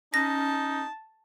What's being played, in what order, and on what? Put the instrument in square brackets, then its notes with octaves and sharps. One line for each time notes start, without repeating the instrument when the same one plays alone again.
[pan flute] C#4 [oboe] D#4 [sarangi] A5 [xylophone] A#6